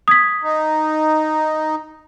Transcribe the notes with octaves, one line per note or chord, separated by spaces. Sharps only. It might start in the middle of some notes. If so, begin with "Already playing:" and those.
D#6 G#6 B6
D#4